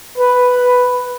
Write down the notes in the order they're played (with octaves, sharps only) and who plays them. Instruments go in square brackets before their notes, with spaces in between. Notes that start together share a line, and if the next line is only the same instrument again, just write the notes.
[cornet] B4